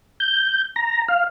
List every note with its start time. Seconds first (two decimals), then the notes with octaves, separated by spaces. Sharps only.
0.20 G6
0.76 A#5
1.08 F5